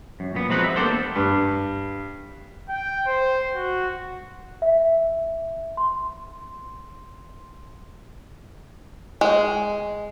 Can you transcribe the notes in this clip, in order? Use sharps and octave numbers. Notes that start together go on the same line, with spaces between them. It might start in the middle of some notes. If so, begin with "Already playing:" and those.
F#2
A#2 B3
F3 G#3 C4 D#4 F#4 B4
E5
G3 A#3 B3 D4 A4 C5
G2
G5
C5
F#4
E5
C6
G#3